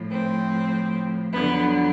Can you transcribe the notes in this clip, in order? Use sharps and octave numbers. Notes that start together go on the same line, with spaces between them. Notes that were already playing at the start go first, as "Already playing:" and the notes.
Already playing: A2 F3
C4
F2 D3 F#3 B3